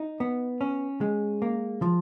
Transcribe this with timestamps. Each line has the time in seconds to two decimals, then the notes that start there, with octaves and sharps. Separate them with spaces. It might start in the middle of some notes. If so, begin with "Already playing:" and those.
Already playing: D#4
0.20 B3
0.61 C#4
1.01 G#3
1.42 A#3
1.82 F3